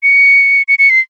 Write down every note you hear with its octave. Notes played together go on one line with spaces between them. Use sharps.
C#7
C#7
C#7
C7